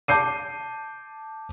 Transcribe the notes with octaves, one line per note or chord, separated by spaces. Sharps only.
A5 D6 G6 C7 D#7